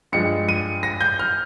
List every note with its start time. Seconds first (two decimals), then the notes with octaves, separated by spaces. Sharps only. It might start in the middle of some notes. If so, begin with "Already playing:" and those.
0.12 G2 F3 G#3 C#7
0.49 D#7
0.83 A#6
1.01 G6
1.19 F6